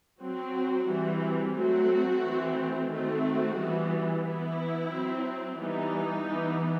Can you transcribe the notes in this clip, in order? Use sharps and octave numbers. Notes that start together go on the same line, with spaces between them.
F#3 C4 F#4
E3 G3 C4
F#3 A3 C4 F#4
E3 A3 C4
D#3 A3 C4 F#4
E3 G3 B3
E3 B3 E4
F#3 C4
E3 G3 B3 D#4
E3 B3